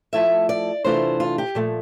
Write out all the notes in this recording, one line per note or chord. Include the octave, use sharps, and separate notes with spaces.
F3 A3 E4 E5
D5
C3 E3 A3 D4 F4 C5
F4
G4
A#2 F3 A3